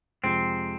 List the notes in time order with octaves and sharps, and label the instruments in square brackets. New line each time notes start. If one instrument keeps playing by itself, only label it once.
[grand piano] F2 C3 F3 G#3 [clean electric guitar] C4